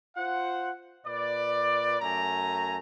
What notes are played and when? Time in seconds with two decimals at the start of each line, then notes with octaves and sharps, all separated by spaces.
0.16 F4 C5 F#5
1.05 A#2 B4 D5
2.01 F#2 A3 G#5 A#5